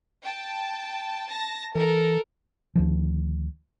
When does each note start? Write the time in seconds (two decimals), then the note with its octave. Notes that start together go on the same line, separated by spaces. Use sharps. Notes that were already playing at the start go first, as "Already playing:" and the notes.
0.23 G5 A5
1.29 A5 A#6
1.75 E3 A4 A#4
2.75 D2 D#3 F3